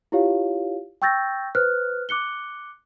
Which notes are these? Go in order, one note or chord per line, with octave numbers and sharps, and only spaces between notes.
E4 F4 G4 C#5 F5
G5 C#6 E6 G6 A6 A#6
B4 C5 F6 F#6
D6 F#6 C#7 G7